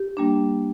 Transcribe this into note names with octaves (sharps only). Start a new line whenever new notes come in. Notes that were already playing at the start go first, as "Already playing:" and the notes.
Already playing: G4
G3 A#3 D4